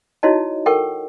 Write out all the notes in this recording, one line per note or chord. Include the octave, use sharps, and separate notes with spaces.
D#4 E4 F#4 C#5 D#5 A5
A4 A#4 F#5 G5 C#6